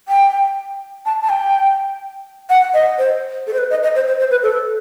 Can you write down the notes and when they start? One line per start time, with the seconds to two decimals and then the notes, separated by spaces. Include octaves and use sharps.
0.08 G5
1.06 A5
1.22 A5
1.29 G5
2.50 F#5
2.74 D#5
2.98 C5
3.47 A4
3.53 C5
3.58 B4
3.70 D#5
3.83 D#5
3.95 C5
4.08 C5
4.19 C5
4.31 B4
4.43 A4